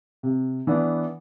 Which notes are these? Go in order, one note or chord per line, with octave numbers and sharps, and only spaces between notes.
C3
E3 B3 D4